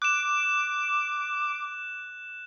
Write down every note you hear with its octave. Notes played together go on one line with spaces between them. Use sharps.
D6 F#6 E7